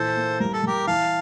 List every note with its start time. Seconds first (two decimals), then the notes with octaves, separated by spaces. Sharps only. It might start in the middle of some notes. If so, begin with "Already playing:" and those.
Already playing: A#2 E3 A4 C5
0.16 A#3
0.40 G3 A#4
0.54 A4
0.64 G3 G4 A#4
0.87 E3 F5 A5